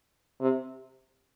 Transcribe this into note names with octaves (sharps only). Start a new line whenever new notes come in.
C3